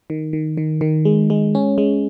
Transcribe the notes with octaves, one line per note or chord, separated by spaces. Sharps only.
D#3
D#3
D#3
D#3
G#3
G#3
C#4
G#3